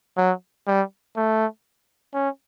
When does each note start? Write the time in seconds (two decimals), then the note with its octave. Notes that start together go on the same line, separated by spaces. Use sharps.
0.17 F#3
0.67 G3
1.16 A3
2.14 C#4